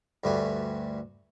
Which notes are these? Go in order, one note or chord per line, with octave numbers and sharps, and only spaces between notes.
D2 G2 G3 A3 F#4 G#5